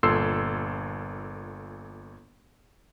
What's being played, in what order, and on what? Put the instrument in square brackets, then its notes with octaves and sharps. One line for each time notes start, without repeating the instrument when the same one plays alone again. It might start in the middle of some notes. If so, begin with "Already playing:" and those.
[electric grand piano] G1 A#2 A4 C6 E6 C7